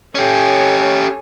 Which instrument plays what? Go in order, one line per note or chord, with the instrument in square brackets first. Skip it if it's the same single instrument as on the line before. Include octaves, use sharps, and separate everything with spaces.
[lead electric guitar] C#4 G4 [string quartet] A4 C#5 G#5